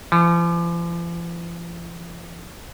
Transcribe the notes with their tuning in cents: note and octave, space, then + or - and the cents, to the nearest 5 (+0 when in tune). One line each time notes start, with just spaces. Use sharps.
F3 -45